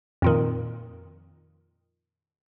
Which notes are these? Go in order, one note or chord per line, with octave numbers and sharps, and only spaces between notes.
F2 A#2 D#3